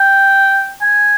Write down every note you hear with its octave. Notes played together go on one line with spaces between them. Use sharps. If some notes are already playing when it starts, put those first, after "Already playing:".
Already playing: G5
G#5